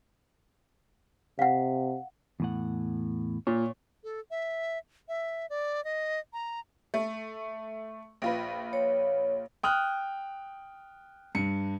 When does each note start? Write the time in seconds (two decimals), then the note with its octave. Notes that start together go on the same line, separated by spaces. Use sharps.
1.39 C3 F5 F#5
2.40 E2 A2 F#5
3.47 A#2 C#5
4.04 A4
4.31 E5
5.08 E5
5.50 D5
5.84 D#5
6.33 A#5
6.94 A3
8.22 A#1 F4 B4
8.73 C#5
9.63 G5 D#6 F6 F#6
11.35 G2 C#7